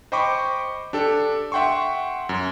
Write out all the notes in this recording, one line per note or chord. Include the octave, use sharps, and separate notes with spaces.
C5 D#5 G5 B5 C#6 D6
D4 G4 A4
E5 F#5 G5 C6 C#6
F#2